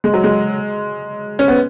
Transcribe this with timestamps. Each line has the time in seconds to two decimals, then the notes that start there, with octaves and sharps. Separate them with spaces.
0.04 G#3
0.14 F#3
0.24 G#3
1.39 C#4
1.48 B3